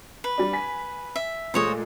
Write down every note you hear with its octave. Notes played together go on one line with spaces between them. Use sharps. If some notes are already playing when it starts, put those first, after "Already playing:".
B4
G3 D4
G#5 B6
E5
A#2 G#3 A3 C5 C#5 D#5